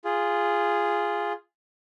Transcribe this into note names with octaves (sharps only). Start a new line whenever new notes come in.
F4 G#4